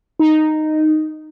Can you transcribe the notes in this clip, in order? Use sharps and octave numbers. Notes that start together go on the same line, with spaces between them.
D#4